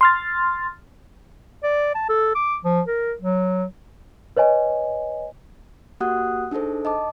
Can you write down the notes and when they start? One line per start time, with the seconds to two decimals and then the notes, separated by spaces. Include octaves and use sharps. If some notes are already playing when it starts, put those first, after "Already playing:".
0.01 C6 F6 A6
1.63 D5
1.95 A5
2.09 A4
2.35 D6
2.64 F3
2.87 A#4
3.22 F#3
4.36 B4 C#5 D#5 G#5
6.00 A#3 F#4 G4 F#5 D#6 F#6
6.51 D4 D#4 G#4 A4 C5
6.85 D#5 A5 D6